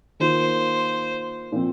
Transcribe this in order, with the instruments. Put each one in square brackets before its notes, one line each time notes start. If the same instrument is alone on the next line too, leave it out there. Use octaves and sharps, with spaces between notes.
[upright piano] D#3 A#3 F4 [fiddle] C5
[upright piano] A#2 F3 C4